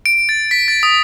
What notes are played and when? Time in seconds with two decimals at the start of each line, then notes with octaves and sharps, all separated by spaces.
0.06 D7
0.29 A6
0.51 B6
0.68 A6
0.83 D#6